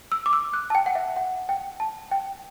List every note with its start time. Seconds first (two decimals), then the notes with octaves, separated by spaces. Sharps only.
0.12 E6
0.26 D6
0.33 E6
0.53 F#6
0.70 A5
0.75 G5
0.86 F#5
0.95 E5
1.16 F#5
1.49 G5
1.80 A5
2.12 G5